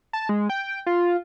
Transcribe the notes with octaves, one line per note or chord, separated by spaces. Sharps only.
A5
G#3
G5
F4